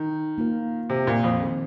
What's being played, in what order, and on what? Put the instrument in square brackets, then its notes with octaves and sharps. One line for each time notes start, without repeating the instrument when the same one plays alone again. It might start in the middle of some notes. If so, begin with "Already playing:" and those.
Already playing: [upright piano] D#3
[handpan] A#3 F4 A#4
[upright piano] C3
A#2
F2
[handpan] D#3 C4 G#4 C5